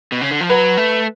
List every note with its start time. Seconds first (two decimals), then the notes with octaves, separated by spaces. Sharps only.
0.12 B2
0.21 C#3
0.31 D3
0.41 F3
0.50 F#3 B4
0.77 A3